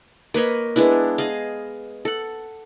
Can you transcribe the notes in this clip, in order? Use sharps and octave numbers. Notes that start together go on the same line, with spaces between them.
A#3 B4 C#5 D#5
G#3 B3 D4 E4
G#4 D#5 F5
A4 F#5